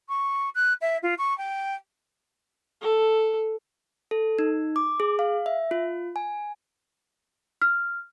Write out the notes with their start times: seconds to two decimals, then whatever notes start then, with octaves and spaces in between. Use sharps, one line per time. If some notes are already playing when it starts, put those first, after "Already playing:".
0.09 C#6
0.55 F#6
0.81 E5
1.03 F4
1.18 C#6
1.38 G5
2.82 A4
4.11 A4
4.39 D#4
4.76 D6
5.00 G#4
5.19 F5
5.46 E5
5.71 F4
6.16 G#5
7.62 F6